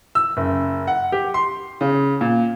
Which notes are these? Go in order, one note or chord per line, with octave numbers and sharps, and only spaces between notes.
E6
F#1
F#5
G4
C6
C#3
A#2